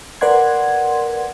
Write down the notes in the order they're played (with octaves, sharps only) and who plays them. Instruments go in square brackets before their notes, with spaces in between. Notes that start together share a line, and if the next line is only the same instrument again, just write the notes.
[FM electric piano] A#4 B4 D5 F#5 C6 G#6